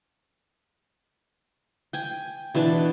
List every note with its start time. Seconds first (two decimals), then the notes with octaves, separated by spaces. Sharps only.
1.93 G5 G#5
2.54 B2 E3 D4 A5